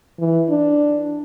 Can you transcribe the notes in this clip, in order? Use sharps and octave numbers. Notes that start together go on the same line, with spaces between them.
E3
D4